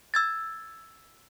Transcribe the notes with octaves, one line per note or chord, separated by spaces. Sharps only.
E6 G#6 A6